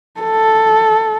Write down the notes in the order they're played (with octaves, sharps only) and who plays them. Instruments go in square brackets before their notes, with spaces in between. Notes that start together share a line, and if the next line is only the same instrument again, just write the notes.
[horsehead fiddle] A4